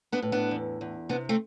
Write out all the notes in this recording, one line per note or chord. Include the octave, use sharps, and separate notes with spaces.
B3 D4
A2
B3 D4
E2
E2
C3 B3 D4
A3 C4